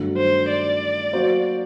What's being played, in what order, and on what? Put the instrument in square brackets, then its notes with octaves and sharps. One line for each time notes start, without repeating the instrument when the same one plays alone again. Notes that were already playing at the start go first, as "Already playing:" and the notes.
Already playing: [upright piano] G2 D#3 F#3 A3
[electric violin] C5
D5
[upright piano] F#3 A#3 F#4 C5